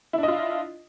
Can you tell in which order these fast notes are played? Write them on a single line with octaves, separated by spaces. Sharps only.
E4 D4 D#5 F4